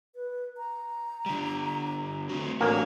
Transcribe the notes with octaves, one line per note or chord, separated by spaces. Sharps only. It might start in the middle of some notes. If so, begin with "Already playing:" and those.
B4
A#5
D3 G3
A3 C4 F#4
A1 A#3 D4 F#4 C#5